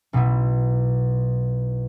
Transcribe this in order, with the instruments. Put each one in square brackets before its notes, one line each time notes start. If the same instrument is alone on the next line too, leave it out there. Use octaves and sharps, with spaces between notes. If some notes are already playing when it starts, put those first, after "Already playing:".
[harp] B1 B2 B3 E4